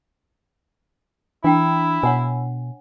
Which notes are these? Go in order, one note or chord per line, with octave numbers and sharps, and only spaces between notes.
E3 D4 E4 G5 A#5
B2 C#5 F#5 G#5